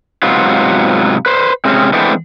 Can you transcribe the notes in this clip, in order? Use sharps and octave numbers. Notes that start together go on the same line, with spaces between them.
G#2 C3 F#3 B3 F4
B4 C5
C3 G#3 C4 C#4
E3 G#3 A3 B3 C4 D4